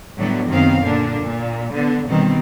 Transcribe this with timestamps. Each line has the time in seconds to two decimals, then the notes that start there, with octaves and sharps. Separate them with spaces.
0.18 A2 D3 F#3 G3 B3
0.49 F#2 C3 D#3 B3 C4 F5
0.83 A#2 D3 A#3 D4
1.22 A#2
1.72 D3 B3
2.08 B2 D#3 G3 C4